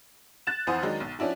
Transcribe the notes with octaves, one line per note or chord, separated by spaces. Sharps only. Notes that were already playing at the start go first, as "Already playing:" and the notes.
F#6 A6 E7
F2 E3 C5 F#5 G#5 D#6
D#3 F#3 G#3 D4 D#4
B1
F3 C#4 D4 E4 F#4